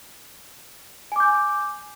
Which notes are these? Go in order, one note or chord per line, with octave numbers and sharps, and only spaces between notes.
G#5 D6 G6